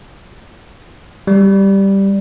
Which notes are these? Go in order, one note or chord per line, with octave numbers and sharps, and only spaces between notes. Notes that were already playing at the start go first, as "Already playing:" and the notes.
G3